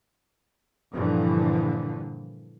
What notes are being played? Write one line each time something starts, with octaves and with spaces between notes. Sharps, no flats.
G2 A#2 D3 E3 F3